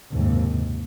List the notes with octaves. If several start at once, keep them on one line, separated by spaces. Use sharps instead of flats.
F#1 D#2 G#2 C3